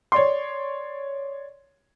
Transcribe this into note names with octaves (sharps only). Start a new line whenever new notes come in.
C#5 D5 C6